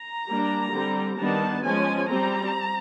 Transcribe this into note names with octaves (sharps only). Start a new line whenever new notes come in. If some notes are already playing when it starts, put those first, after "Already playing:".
Already playing: A#5
G3 A#3 D4
D3 G3 C4
D#3 G3 B3 D4 A5
F3 G#3 C#4 G#5
G3 C4 A#5